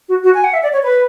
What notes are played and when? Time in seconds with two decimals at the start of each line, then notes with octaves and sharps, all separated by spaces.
0.09 F#4
0.24 F#4
0.34 G#5
0.44 F#5
0.53 E5
0.63 D5
0.73 C#5
0.83 B4